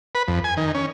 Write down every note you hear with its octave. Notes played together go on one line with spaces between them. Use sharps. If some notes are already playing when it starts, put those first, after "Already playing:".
B4
F2
G#5
D#3
C#4